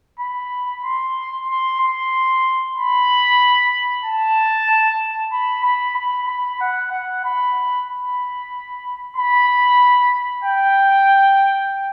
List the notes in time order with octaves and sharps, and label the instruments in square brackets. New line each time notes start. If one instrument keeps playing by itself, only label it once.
[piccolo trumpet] B5
C6
C6
C6
B5
A5
B5
B5
B5
B5
F#5
F#5
B5
B5
B5
G5